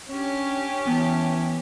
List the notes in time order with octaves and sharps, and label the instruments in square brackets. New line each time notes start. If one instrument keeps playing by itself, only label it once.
[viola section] C#4 [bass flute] D4 [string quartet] G4
[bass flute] E3 [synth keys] B3 A5